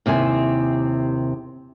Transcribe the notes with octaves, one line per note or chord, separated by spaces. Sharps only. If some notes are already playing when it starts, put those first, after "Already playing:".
D#2 C3 E4 G#5